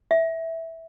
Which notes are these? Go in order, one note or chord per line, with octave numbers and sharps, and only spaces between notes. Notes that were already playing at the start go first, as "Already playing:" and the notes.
E5